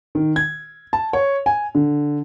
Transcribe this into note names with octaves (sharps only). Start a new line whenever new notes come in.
D#3
G#6
A5
C#5
G#5
D3